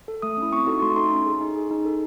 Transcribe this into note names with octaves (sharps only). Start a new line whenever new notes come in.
A4
A3 D#6
C#4 E4
C4 C#6
D#4 F#4 A4 C#6
A3 C6
D#4 A4 C6
C#4
G#4
D#4
G#4
D#4
A4